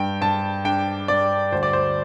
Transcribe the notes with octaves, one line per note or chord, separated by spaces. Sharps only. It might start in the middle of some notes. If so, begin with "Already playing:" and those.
Already playing: G2 G5
G2 A5
D4 G5
G2 D5
D2 C5
D5
C5